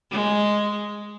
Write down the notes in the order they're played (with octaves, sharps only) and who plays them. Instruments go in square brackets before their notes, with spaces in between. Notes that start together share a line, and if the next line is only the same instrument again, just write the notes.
[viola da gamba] G#3